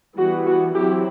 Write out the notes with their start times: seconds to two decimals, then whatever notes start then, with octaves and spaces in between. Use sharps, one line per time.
0.17 E3 G3 B3 F#4
0.46 F#4
0.75 F#3 C4 E4 G4